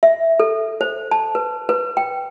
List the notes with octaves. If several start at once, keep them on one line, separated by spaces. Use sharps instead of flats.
E5
A4
C5
A5
B4
B4
G5